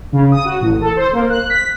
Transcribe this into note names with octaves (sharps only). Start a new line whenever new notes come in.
C#3
D#6
F#4
A1
A4
C5
A#3
F#6
B6